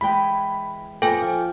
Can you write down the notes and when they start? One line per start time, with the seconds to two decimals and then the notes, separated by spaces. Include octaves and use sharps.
0.01 E3 G#3 G5 B5
1.02 F2 B3 C4 A4 G5 G#5
1.22 F3